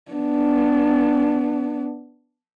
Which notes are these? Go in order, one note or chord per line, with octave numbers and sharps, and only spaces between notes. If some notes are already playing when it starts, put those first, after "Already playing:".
B3 D4